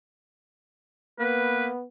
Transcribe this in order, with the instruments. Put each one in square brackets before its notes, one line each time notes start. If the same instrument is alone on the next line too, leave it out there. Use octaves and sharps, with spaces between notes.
[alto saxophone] A#3 [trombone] B3 [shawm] B4